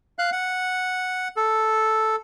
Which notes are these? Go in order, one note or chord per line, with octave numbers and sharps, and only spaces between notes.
F5 F#6
F#5
A4